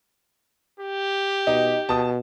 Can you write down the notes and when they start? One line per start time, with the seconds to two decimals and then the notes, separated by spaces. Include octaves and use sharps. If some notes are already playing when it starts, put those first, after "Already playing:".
0.80 G4
1.47 B2 D#4
1.89 B2 A5 D#6